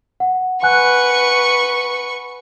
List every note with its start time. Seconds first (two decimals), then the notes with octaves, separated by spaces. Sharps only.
0.20 F#5
0.63 B4 F#5 G#5 C#6 F#6